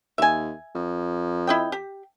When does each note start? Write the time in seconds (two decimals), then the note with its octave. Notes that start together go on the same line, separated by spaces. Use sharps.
0.18 D#2 E5 G#5
0.75 F2
1.47 E4 D#5 G5
1.72 G4